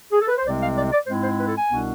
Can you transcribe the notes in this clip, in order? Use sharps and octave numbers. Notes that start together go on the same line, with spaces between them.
G#4
A4
B4
C5
C2 C3 G#3 C4 D5
F5
D5
D5
G#2 G#3 C4 E4 C5
C5
B4
A4
G#5
C2 B2 B3 D4